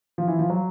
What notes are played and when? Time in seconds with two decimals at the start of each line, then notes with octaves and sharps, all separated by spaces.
0.18 F3
0.28 E3
0.39 F3
0.50 F#3